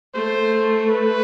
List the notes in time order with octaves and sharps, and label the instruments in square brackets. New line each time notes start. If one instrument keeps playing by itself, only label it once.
[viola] A3 [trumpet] C5
[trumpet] B4